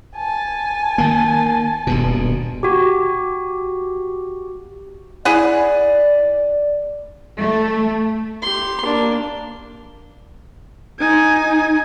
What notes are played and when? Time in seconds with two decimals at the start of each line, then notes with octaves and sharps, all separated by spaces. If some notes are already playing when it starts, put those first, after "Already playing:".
0.16 G#5 A5
0.98 D#3 A#3
1.87 D#1 G2 B2
2.63 F#4 G4
5.25 E4 G#4 D5 F#5
7.39 A3
8.42 G4 C6
8.84 A#3 D4
10.99 D#4 G#5